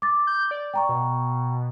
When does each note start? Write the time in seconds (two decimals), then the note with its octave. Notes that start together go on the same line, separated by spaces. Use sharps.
0.02 D6 A6
0.27 G6
0.51 D5
0.74 G5 A#5 C#6
0.89 B2